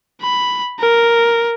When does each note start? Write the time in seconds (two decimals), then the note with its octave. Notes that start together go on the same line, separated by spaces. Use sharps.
0.22 B5
0.79 A#4